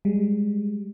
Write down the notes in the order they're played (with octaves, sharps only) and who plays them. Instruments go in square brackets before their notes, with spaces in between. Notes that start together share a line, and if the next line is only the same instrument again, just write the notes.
[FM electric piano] G3 G#3